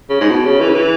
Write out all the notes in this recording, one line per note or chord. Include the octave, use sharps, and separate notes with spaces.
C#3
G#2
B2
C#3
E3
C#3
E3